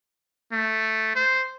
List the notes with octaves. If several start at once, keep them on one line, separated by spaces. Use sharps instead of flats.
A3
C5